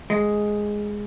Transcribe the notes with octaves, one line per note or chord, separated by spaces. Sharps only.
G#3